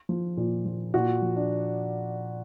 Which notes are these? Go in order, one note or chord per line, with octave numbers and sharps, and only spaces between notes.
F3
A#2
F3
A#2 F#4
F3
D4